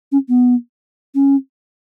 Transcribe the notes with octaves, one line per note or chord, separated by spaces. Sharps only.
C#4
B3
C#4